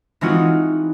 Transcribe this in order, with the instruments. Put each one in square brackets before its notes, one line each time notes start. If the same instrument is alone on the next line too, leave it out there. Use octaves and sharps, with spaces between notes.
[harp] E3 G#3 C4 D#4 F4 F#4